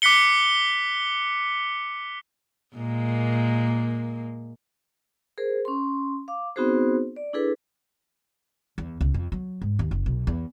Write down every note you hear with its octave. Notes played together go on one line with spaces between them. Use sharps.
D6 F#6 B6 C#7 G7
A#2 G#3 A#3
G#4 A#4 C5
C#4 C6
F5 D6
B3 C4 D#4 F#4 G#4 C5
D5
D4 E4 G#4 A4 B4
E2
C#2
F2
F#3
G#2
D#2
F#1
B1
E2